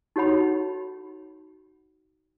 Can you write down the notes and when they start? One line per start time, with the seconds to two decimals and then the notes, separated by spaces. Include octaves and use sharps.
0.16 D#4 F#4 A4 C#5 F#5 B5